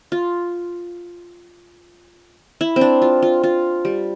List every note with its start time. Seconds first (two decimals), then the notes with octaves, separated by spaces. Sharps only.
0.12 F4
2.61 E4
2.76 C4
2.81 D4
3.02 F4
3.23 F4
3.43 F4
3.85 G3